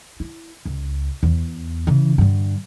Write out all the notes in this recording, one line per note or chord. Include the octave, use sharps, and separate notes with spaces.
E4
C#2
E2
C#3 E3
G2 D3